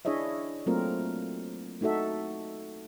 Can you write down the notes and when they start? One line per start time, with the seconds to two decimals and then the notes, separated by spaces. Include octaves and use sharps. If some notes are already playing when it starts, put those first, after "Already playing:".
0.05 D4 E4 G#4 C#5 D#5 E5
0.66 F#3 A3 A#3 C4 F4 A#4
1.81 A3 D#4 F#4 A4 E5